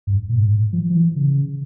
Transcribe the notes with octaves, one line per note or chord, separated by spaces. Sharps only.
G2
A#2
G#2
F3
F3
E3
C#3